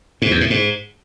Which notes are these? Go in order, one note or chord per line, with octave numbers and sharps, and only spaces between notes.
G#2
E2
A2
G#2